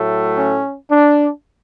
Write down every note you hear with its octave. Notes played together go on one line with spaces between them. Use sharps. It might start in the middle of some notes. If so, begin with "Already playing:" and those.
Already playing: A2 F#3 A3
C#4
D4